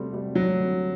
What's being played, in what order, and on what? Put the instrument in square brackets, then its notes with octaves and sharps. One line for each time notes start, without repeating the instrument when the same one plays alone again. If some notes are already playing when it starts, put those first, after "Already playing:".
Already playing: [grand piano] C3 G3 C4 F#4 [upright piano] A3
[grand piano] G3 C4 F#4
[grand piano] D2 [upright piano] F#3
[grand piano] D3 G3 C4